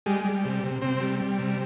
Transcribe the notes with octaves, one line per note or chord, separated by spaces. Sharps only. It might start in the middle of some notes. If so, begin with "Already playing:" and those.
G3 G#3
G3
C3
C3
C3 C4
G3
G3
C3